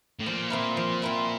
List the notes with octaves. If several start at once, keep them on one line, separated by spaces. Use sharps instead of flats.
A2
A#2 F3
C4 E4 A#4 E5
F3
C4 E4 A#4 E5